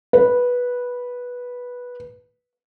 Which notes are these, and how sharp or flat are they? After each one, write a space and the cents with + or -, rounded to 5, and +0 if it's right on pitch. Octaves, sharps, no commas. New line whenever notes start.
B4 -10